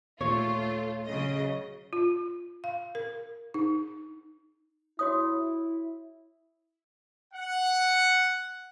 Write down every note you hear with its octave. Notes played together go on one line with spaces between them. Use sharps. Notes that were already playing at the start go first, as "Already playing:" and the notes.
D#2 A#2 A3 F4 C#5
C#3 F#3 D#5
F4
F5
A#4
D#4
E4 F#4 C#5 D#6
F#5